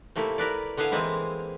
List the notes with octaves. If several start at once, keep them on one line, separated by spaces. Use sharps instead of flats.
C3 A3 A#3 E4
E4 A#4 B4 D5
D3 B3 E4 F5 G#5
E3 G#3 A#3 C4 E4